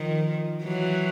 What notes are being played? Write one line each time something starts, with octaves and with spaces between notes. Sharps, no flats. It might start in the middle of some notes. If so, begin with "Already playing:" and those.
Already playing: D#3 F3
E3 F#3